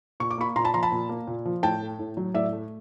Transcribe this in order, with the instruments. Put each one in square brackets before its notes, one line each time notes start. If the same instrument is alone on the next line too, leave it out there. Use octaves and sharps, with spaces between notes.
[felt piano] A#2 C#6
D6
A#3 B5 C#6
A#2 A#5 C6
A5 B5
F3 A#5 C6
A5 B5
A#2
A#3
A#2
F3
A2 G5 A5
A3
A2
F#3
A2 D5 E5
A3